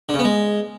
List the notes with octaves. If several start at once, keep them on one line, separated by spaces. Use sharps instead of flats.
D3
C#3
B3
G#3